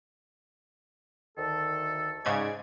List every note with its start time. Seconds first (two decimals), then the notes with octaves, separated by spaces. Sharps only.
1.38 D2 D#3 A4
2.25 G#2 C#3 G#3 D5 G#6